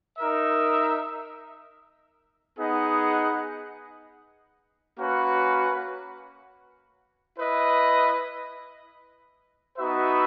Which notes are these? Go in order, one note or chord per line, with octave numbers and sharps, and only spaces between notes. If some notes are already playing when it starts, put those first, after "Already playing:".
D#4 A#4 E5
B3 D#4 G#4 D#5 F#5
A#3 C#4 F#4 B4 F#5
E4 B4 D#5
B3 D#4 F#4 B4 E5